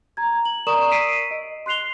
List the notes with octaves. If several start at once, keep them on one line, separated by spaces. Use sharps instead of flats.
A#5 G#6
F#7
A#4 D5 A#5 C#6 D#6 E7
E6 B6 C7 D7 D#7
D#5
C6 F#6 C7 F7 G7